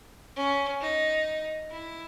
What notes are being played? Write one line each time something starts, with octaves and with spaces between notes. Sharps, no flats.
C#4
D#4
E4